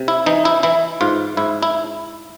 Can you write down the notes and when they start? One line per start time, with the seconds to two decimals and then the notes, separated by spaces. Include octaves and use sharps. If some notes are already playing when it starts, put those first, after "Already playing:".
Already playing: C3
0.08 E4
0.26 E3 D#4
0.45 E4
0.63 E3 E4
1.01 G#2 F4
1.37 G#2 E4
1.63 E4